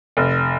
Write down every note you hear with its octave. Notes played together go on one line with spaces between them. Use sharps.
F1